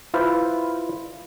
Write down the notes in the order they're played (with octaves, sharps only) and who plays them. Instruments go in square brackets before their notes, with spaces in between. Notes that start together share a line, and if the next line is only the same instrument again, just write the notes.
[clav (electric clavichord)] E4 F4 B4 C5